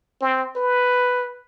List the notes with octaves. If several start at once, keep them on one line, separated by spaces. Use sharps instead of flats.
C4
B4